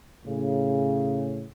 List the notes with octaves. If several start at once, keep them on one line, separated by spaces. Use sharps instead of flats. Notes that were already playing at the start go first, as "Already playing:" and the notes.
A2 C#3